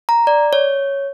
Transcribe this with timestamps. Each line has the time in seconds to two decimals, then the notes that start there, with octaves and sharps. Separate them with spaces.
0.09 A#5
0.27 D5
0.53 C#5